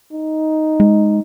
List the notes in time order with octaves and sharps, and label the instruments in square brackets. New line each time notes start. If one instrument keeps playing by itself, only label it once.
[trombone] D#4
[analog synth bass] G#3